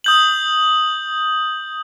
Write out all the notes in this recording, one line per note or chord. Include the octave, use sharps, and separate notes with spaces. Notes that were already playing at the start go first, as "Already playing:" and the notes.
D#6 G6 F#7